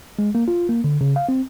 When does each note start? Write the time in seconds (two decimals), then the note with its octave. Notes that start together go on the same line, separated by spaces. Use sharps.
0.19 G#3
0.35 A#3
0.48 F4
0.69 A#3
0.84 D3
1.01 C#3
1.16 F5
1.29 C4